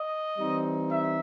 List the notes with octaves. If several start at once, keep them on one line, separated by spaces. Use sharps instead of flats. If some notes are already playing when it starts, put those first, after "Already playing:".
Already playing: D#5
E3 G3 C4 D#4
E5